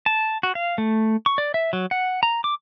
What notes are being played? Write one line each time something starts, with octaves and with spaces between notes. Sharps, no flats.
A5
F#4
F5
A3
C#6
D5
E5
F#3
F#5
A#5
D6